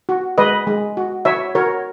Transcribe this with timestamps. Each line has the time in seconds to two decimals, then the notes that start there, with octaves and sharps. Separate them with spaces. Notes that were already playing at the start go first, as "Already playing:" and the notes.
0.09 F#4
0.38 G#3 B4 D#5
0.67 G#3
0.97 F#4
1.25 F#4 C#5 E5
1.55 F#4 A#4 C#5